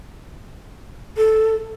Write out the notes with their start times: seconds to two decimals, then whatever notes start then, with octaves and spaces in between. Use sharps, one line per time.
1.17 A4